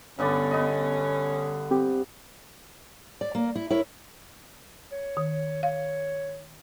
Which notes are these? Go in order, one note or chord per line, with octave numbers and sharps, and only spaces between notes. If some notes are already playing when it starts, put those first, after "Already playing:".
G2 D3 B3 C#4 D5
B3 D#5
C4 G4
D5
A#3
E4
E4 A#4 C#5
C#5
D#3
C#5 F5